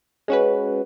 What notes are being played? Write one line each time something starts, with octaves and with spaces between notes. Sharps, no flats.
G#3 C#4 F#4 B4